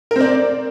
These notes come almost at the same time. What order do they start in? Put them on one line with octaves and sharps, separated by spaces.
A#4 C4 D5